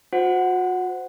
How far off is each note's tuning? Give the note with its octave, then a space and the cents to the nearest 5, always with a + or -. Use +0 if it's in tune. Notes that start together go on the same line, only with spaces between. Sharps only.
F#4 -40 C5 -10 F#5 +0